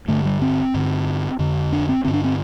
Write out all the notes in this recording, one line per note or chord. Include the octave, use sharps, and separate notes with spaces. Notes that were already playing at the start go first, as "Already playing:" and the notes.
G2 D3 A3
G3
C4
G2 D3
F2 D3
D4
C4
G2 D3 C4
D4
C4